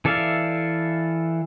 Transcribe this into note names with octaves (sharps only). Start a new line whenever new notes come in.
E3 A4 D5 E5 F5